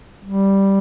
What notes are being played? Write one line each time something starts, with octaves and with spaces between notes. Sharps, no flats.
G3